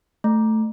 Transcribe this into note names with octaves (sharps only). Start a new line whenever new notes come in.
A3